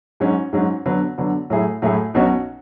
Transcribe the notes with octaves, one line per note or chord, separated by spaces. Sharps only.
G#2 F#3 C#4
G#2 F#3 C#4
D3 F#3 B3
D3 F#3 B3
A2 F#3 A3 E4 G#4
A2 F#3 A3 E4 G#4
B1 B2 F#3 C#4 F#4